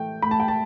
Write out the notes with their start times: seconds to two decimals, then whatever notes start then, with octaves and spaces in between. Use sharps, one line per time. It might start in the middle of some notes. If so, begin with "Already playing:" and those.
Already playing: A2 E3 A3 G5
0.22 A2 B5
0.31 A5
0.40 G5
0.48 A5